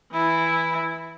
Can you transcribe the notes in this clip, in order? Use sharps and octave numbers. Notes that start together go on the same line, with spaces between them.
E3 E4